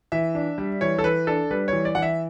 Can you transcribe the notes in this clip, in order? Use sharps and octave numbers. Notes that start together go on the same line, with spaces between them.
E3 E5
D4
G3
E3 C#5
A4
E3 B4
D4 A4
G3 B4
E3 C#5
D5
E3 F#5
E5